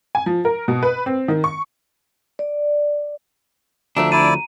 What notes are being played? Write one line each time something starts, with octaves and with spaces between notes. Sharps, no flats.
G#5
F3
A#4
B2
B4
C4
D#3
C#6
D5
D2 F3 A3 D4 E5 A#5
E4 D5 D#7